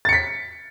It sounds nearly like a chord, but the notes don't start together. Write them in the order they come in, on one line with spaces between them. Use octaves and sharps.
A6 C#7 B6